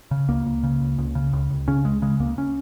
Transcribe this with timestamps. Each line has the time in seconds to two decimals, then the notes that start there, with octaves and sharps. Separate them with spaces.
0.11 C#3
0.29 C#2 A#3
0.46 C#2
0.63 C#3
0.81 C#2
0.98 C#2
1.15 C#3
1.33 C#2
1.51 C#2
1.68 C#3 C#4
1.85 C#2 G#3
2.02 C#3 G#3
2.20 C#2 A#3
2.38 C#4